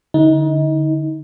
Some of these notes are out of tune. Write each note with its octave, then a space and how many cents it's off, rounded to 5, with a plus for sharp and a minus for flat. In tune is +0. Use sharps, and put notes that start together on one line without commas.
D3 +0 D#4 +30